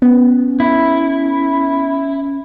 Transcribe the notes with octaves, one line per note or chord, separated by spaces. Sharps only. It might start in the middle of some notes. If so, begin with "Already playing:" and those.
B3 C#4
E4